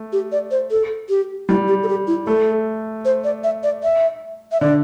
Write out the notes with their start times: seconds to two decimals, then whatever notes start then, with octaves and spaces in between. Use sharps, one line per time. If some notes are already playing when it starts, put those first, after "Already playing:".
Already playing: A3
0.13 G4
0.32 D5
0.51 C5
0.71 A4
1.09 G4
1.49 G3 E4
1.68 G4
1.83 A4
1.89 G4
2.07 E4
2.27 A3 A4
3.05 C5
3.24 D5
3.44 E5
3.63 D5
3.83 E5
4.52 E5
4.61 D3 D5